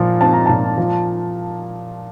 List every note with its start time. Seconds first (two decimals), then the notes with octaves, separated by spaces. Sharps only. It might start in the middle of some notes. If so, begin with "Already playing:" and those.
Already playing: A#2 F3
0.21 C4 A5
0.33 A#5
0.46 A#2 A5
0.78 F3